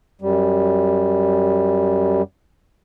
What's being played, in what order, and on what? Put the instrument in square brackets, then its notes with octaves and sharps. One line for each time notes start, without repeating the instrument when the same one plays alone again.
[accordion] F#2 G3